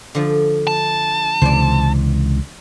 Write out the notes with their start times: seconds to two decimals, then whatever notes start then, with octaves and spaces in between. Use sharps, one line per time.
0.15 D3 F3
0.67 A5
1.42 C#2 C3 E3 C5 D5